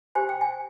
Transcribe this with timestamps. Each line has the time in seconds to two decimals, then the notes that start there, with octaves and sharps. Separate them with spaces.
0.15 G4 C5 G#5
0.29 G5
0.41 G#5